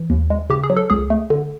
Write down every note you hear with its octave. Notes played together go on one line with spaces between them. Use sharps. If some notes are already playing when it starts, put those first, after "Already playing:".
Already playing: E3
D#2
G#3
C#3 G4
G#4
F#3
A4
C#2 G#4
A3
D3